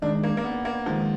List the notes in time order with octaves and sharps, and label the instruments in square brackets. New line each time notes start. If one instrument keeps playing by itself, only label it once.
[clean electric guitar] D#3 G#3 D#4 [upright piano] D4
[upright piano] A#3
A#3
B3
A#3
[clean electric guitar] D#3 G#3 D#4 [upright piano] F3